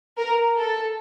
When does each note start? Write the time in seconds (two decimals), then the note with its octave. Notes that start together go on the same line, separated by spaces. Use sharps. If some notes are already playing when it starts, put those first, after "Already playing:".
0.18 A#4
0.57 A4